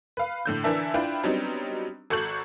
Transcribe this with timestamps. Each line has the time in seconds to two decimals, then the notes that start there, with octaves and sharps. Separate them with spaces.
0.17 B4 F5
0.45 A2 D3 G6
0.64 D3 E3 D4 A#4 E5 A5
0.94 D4 E4 F4 B4 G5
1.23 F#3 G3 B3 C4 D4 D#4
2.10 G#1 F#4 A4 C#6 G6 F#7